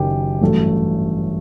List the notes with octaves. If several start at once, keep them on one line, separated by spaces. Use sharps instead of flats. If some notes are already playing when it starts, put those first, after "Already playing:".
Already playing: F#1 F#2 D#3 G4
A1 G2 F#3 A3